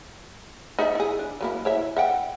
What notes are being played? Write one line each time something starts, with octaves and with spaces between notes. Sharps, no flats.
D#4 D5 E5
E4 G#4
D4
F#3 A#3 E4
E4 C#5 E5
E5 F#5 G5